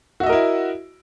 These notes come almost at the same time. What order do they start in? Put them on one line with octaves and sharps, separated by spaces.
F#4 E5 D#5 A#4 E4